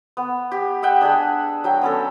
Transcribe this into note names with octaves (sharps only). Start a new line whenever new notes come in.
B3
G4
D#5 E5 F#5 G5
D4 G#4 A5 B5
F#3 G5
B3 C#4 A4